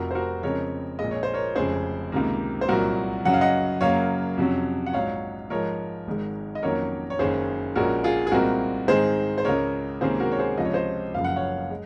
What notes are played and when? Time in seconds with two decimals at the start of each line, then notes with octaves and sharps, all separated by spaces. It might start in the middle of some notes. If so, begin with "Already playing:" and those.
Already playing: F1 F2 C3 F3 F#4 A#4
0.11 C5
0.15 F#4 A#4
0.43 F2 C#3 G#3 C4 A#4 C#5
0.99 A#1 A#2 G#3 D#5
1.11 C#5
1.23 C5
1.33 A#4 C#5
1.55 F1 F2 C#3 G#3 C#4 G#4 C5
2.12 C#2 C3 D#3 A#3
2.61 C5
2.68 C2 A#2 F#3 F#4 A#4
3.25 F#2 C#3 F#3 F#5
3.34 F5
3.41 D#5 F#5
3.81 F#2 C#3 F#3 A#3 C#5 F5
4.37 F2 C3 F#3 C#4
4.86 F#5
4.93 A#1 G#2 F#3 C#5 F5
5.50 G#2 F3 G#3 A#4 C#5
6.07 G#1 G#2 D#3 G#3
6.55 D#5
6.62 F2 D#3 F#3 A#3 C#4 A#4 C#5
7.10 C#5
7.19 F#1 F#2 D#3 G#3 C#4 G#4 C5
7.76 A#1 A#2 G#3 C#4 F#4 A#4
8.04 F4 G#4
8.27 G#4
8.32 C2 A#2 G#3 C4 F#4 A#4
8.88 G#2 D#3 G#3 C4 G#4 C5
9.38 C5
9.45 C#2 C#3 G#3 A#4 C#5
10.01 C#2 C3 D#3 A#3 C#4 G#4 C5
10.20 F#4 A#4
10.32 C#5
10.39 G#4 C5
10.57 C#2 C3 F3 D#5
10.65 C#5
10.73 C5 D#5
11.14 F#1 F#2 C#3 F3 F5
11.24 F#5
11.36 C#5 F5
11.71 G#3